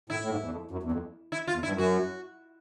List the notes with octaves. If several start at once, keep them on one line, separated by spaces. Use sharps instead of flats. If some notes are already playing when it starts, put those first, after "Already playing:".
A2 E4
A2
G#2
E2
F2
F#2
E2
F2
E4
F4
E2
G2 E4
F#2
F#4